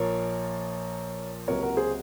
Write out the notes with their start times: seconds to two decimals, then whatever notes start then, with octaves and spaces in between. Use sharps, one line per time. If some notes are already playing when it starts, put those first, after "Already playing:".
Already playing: A#1 A#2 F3 A#3 A#4 C#5
1.48 C#2 C3 F#3 A#3 A#4 C#5
1.63 F#4 A#4
1.77 G#4 C5